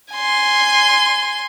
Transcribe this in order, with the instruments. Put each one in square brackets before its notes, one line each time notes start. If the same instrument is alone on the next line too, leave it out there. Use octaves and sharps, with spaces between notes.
[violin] G#5 C6